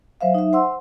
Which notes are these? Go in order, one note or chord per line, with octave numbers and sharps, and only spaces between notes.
F#3 C5 E5 F5
D#4 E5
C5 F#5 C6 E6